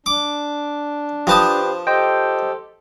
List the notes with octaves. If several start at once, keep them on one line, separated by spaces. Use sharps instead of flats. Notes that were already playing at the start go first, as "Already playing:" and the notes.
D4 D6
F3 G4 B4 C5 A5 D#6
G4 A4 C5 D#5 G5